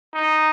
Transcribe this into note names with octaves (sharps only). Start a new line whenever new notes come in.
D#4